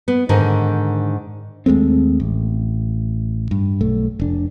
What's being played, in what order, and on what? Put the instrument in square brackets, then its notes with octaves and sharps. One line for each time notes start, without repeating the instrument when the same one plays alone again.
[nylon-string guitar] B3
G#2 D3 D#3 A#4
[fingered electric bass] D#2 G#3 A3 C4
A1
G2
B1 A3
F1 D4